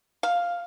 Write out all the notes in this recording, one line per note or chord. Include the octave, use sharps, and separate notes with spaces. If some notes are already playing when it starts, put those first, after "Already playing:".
F5